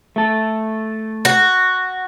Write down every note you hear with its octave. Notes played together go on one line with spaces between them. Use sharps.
A3 A4
F#4